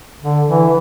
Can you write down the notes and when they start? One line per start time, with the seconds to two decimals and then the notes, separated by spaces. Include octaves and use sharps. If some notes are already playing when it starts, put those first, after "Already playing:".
0.22 D3
0.48 E3